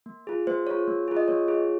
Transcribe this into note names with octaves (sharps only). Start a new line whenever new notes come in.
A#3
F4 G#4
A#3 C5
F4 G#4 C#5
A#3
F4 G#4
D#5
A#3 C#5
F4 G#4